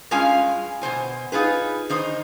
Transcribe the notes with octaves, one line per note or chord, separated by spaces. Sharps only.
G2 G#3 C#4 F4 F5 G#5
B2 D#3 C5 G#5
D#4 F4 G#4 B4
D#3 D#4 C5